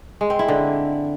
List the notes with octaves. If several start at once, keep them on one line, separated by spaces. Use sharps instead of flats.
G#3
C4
E4
D3